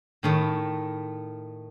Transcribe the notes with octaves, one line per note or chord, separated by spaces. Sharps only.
A2 D#3 A3